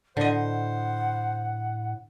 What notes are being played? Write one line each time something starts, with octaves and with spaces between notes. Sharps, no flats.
A2 D3 C5 D#5 F#5